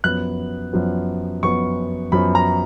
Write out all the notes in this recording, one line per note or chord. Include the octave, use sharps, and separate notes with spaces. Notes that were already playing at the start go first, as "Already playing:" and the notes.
F#2 F3 B3 F#6
F#2 F3 B3
F#2 F3 B3 C#6
F#2 F3 B3 B5
A#5